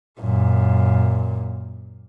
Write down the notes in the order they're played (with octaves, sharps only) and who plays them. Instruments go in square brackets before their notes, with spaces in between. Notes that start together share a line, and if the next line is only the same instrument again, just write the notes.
[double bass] F#2 A#2